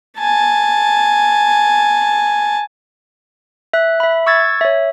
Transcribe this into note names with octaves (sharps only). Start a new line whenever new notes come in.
G#5 A5
E5 F#6
E5 B5
C#6 E6 G#6 A6
C#5 E5